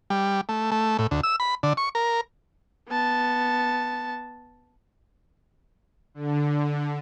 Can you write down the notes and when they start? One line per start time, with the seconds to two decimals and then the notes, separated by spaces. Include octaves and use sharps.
0.10 G3
0.49 A3
0.72 A3
0.99 A2
1.11 D2
1.23 E6
1.40 B5
1.63 D3
1.77 C#6
1.95 A#4
2.89 B3 A5
6.14 D3